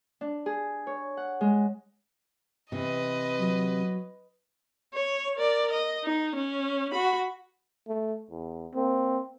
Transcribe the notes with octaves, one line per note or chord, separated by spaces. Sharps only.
D4
G#4
C#5
F#5
G#3
C3 E3 B4 D#5
F#3
C#5
A#4 D5
D#5
D#4
C#4
F#4 B5
A3
E2
A#3 C4